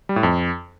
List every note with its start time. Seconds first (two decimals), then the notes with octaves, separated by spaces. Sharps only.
0.09 G3
0.16 A2
0.23 F2